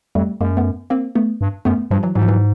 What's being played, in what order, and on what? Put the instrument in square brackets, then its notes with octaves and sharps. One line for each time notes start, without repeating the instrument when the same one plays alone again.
[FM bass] F2 [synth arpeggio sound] G3 A3
[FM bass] F#2 [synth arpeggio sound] G#3 A#3
[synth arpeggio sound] A3 B3
A#3 C4
A3 B3
[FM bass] G2
[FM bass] F#2 [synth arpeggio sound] A3 B3
[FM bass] G2 [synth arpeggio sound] F3 G3
[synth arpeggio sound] E3 F#3
[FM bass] G#2 [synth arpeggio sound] E3 F#3
[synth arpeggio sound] F3
E3 F#3